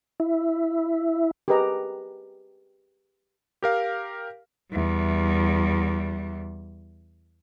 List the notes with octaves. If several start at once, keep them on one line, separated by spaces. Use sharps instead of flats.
E4
G4 G#4 A#4 B4 D#5 A#5
G4 A#4 F5
E2 G3